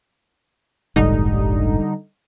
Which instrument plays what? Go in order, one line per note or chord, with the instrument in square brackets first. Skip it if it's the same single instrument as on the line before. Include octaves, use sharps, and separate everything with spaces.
[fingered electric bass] F1 A#1 G#2 [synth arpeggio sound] D3 G3 D#4